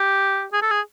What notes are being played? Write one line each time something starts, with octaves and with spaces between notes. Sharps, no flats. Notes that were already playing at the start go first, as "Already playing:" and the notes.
Already playing: G4
G#4
A4
G#4